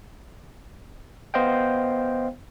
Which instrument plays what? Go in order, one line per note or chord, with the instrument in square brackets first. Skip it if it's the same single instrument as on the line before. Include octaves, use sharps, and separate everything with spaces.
[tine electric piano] B3 C5 D#5 F5 G5